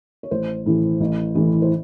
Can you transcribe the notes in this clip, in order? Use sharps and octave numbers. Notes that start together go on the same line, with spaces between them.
C#5
A1 C5
A2 E3
A1
A2 E3
C5